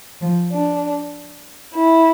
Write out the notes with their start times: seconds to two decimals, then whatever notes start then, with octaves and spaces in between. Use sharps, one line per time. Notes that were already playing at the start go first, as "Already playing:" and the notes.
0.20 F3
0.52 D4
1.75 E4